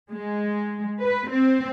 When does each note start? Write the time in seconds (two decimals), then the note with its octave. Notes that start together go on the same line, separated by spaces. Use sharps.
0.12 G#3
1.01 B4
1.30 C4